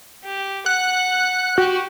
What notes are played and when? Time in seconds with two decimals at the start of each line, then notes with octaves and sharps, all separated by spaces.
0.24 G4
0.66 F#5 F#6
1.58 F#4 G4